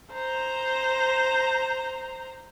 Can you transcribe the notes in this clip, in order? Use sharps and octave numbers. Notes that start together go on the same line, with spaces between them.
C5 A#5